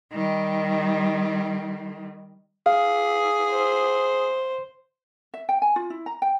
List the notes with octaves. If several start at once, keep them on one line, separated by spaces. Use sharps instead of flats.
D#3 G3
G#4 F5
C5
E5
G5
G#5
F4
E4
A#5
G5